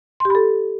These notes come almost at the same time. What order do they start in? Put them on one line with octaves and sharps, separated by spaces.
C6 G4 B5 A4